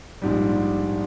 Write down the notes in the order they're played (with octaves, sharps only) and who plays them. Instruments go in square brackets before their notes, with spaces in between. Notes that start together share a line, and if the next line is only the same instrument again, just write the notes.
[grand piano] A#1 G#2 G3